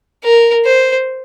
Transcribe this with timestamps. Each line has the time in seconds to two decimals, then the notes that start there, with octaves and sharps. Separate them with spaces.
0.24 A#4
0.66 C5